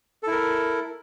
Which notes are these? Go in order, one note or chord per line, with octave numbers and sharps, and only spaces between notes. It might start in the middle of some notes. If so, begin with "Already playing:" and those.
E4 A4 A#4